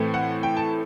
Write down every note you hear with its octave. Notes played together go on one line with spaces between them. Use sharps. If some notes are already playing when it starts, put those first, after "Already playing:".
Already playing: A2 E3 A3 C4
F#5
G5
A5